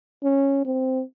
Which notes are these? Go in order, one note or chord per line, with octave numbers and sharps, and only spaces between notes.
C#4
C4